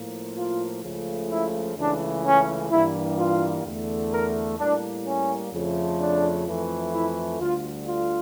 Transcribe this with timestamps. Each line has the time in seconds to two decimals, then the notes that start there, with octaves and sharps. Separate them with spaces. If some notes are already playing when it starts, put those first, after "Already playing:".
Already playing: A2 F3 A#3
0.36 F4
0.83 C#2 C#3 F3 A3
1.30 E4
1.77 C#2 C#3 E3 A3 D4
2.24 C#4
2.70 G2 E3 G3 A#3 E4
3.17 F4
3.65 E2 D3 A3
4.11 A#4
4.58 A2 G3 A#3 D4
5.05 C#4
5.52 F2 C#3 F3 A3
6.00 D4
6.47 F2 E3 A3
6.93 E4
7.40 D2 D3 G3 F4
7.87 F4